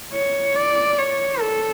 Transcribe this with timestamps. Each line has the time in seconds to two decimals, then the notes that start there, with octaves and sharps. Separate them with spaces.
0.13 C#5
0.56 D5
0.99 C#5
1.40 A4